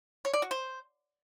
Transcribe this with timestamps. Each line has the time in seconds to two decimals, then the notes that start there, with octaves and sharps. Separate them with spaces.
0.25 C#5
0.33 D5
0.42 F#4
0.51 C5